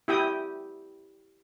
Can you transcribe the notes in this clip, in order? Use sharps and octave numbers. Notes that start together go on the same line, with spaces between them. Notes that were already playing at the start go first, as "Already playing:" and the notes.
E4 G4 G5 D#6